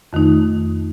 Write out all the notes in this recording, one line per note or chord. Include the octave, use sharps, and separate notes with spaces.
F2 D#3 A3 D#4